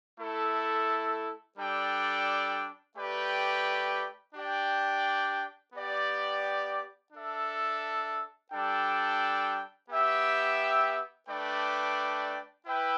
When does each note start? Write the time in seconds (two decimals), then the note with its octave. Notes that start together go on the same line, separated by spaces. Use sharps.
0.20 A3 E4 A4
1.58 G3 D4 A4 D5 G5
2.96 A3 G4 B4 D5 G5
4.35 D4 G4 D5 G5
5.74 B3 G4 D5 G5
7.12 D4 A4 E5
8.51 G3 D4 A4 G5
9.90 B3 G4 E5 G5
11.28 A3 D4 B4 D5 G5
12.67 E4 B4 E5 G5